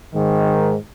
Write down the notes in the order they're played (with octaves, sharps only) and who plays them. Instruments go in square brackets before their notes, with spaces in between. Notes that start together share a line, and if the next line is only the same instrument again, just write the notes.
[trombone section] G#2 D#3